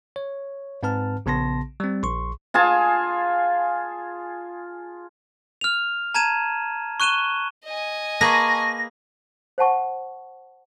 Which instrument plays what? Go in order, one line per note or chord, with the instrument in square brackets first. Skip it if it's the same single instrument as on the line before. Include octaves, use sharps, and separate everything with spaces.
[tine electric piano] C#5
G#2 C4 B4 A5 F6
A#1 C#3 B3 A5 C6 A#6
G3 C4
A#1 C6 C#6
[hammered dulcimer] F4 G#4 G#5 A5
[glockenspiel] F6 F7
A5 A#5 G#6 D#7 E7
C#6 F#6 D#7 E7 G7
[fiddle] D#5 G#5
[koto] A#3 G#4 B4 [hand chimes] A5 A#5 C#6 [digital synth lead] A#6
[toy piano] C5 F#5 A5 C#6